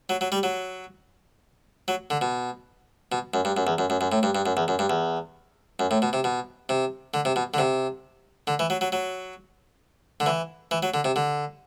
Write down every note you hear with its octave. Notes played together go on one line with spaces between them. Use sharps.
F#3
F#3
G3
F#3
F#3
D3
B2
B2
F#2
G2
F#2
E2
F#2
F#2
F#2
A2
G2
G2
F#2
E2
F#2
G2
E2
F#2
A2
B2
C3
B2
C3
D3
C3
B2
D3
C3
D3
E3
F#3
F#3
F#3
D3
E3
E3
F#3
D3
C3
D3